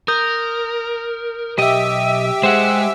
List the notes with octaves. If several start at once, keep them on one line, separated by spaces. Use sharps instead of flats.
A#4 D#6 G6
B1 G4 D#5 E5
G#3 C5 F#5